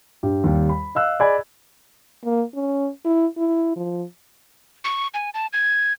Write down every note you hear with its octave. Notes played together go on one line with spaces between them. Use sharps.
G2 G4
D#2 G3
B5
D#5 F5 E6 F#6
G#4 D5 D#5 G#5 B5 G#6
A#3
C#4
E4
E4
F3
C#6
G#5
A5
G#6